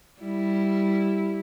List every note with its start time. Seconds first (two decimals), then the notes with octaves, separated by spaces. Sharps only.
0.20 G3 E4